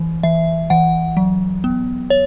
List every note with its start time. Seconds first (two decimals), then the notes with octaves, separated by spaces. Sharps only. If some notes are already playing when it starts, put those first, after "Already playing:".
Already playing: E3
0.23 E3 E5
0.70 E3 F#5
1.17 F#3
1.64 B3
2.10 C#5